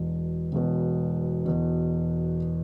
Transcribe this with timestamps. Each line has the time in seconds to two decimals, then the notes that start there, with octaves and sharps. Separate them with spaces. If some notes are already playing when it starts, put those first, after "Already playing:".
Already playing: E1 E2 B2
0.52 E1 E2 B2
1.46 E1 E2 B2